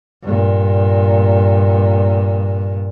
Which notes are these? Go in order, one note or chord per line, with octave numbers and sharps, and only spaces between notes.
G2 A#2